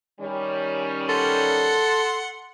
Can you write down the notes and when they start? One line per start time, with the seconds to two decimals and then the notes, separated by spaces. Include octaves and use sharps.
0.20 D#3 G3 C#4
1.09 A4 F#5 C6